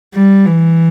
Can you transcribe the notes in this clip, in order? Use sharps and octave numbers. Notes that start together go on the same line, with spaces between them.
G3
E3